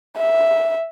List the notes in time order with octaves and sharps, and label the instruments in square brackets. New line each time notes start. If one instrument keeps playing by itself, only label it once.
[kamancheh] E5